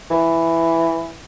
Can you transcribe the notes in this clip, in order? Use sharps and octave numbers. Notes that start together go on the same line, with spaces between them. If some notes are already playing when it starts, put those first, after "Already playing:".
E3